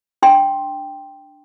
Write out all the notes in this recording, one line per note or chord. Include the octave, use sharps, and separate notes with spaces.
D4 G5 C6